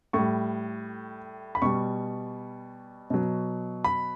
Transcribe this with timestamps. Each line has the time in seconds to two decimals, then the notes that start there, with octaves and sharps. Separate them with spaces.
0.13 A2 G3 C#6
1.55 B5
1.62 B2 G3 C#6
3.10 B2 F#3
3.84 B5